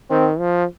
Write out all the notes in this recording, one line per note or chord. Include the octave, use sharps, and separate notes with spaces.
D#3 C4
F3